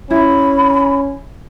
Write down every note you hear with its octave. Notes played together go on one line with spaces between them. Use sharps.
C#4 E4 B5